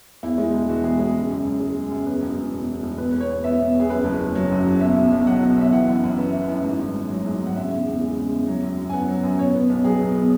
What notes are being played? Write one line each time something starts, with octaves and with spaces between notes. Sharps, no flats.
E2 E4
G#3
E1
E3 F#4
E2 G#4
G#3 G#4
C#3
F#2
F#2
G#3
C#3
F#2
E2 B4
E1
E1
B2
E2
E1
B2 B4
E2 B4
C#5
E2
B3 E5
B2
E2
G#4
F#2 B4
F#1
F#1
F#3
F#2
F#1
B2 E5
B1
B1
F#3 F#5
B2
B1 E5
E3 F#5
F#2
F#2
B3 E5
E3
F#2
G#2
G#1
G#1
F#3
G#2
G#1
F#5
C#3 E5
E2
E2
G#3
C#3
E2
F#3
F#2
F#2
G#5
B3 F#5
F#3
F#2
B2 C#5
B3
B1
F#3 G#4
B2
B3